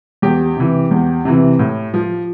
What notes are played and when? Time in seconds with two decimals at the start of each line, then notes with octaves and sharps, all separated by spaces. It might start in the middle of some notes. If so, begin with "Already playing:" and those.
0.22 E2 G4
0.57 C3 E3
0.91 E2
1.25 C3 E3
1.59 A2
1.94 F3